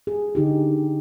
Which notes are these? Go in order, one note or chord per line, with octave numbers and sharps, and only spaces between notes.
G#4
D3 D#4 G4